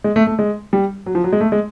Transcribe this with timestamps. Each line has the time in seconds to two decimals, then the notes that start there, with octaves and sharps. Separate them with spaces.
0.04 G#3
0.16 A3
0.27 A3
0.39 G#3
0.73 G3
1.06 F#3
1.15 F3
1.24 F#3
1.33 G#3
1.41 A3
1.52 G#3